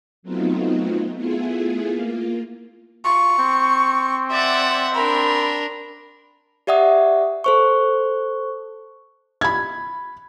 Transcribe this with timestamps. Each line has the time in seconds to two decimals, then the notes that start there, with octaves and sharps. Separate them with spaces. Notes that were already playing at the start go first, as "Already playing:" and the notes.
0.23 F#3 A3 B3 C4 D#4 F4
1.15 A3 B3 E4 F4 G#4
1.88 A#3 F4
3.05 F4 C#6
3.38 C4
4.31 D5 E5 F#5
4.94 D4 A#4 B5
6.67 G4 D5 E5 F#5 D#6
7.44 A4 C5 C#6
9.41 B5 G#6